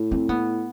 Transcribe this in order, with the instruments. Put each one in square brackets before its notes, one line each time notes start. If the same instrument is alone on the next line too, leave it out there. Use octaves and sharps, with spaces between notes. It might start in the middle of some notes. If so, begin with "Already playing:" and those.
Already playing: [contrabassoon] A2
[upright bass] C4
B3